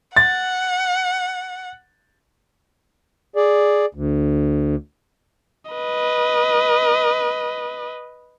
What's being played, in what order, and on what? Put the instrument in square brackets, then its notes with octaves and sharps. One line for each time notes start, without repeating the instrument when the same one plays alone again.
[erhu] F#5 [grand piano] A6
[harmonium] G#4 D5
D2
[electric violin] B4 D#5